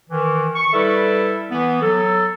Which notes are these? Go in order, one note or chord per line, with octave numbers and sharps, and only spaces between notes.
D#3 E3
C#6
G3 E4 A4 B4 E5
E3 B3
F#3 A4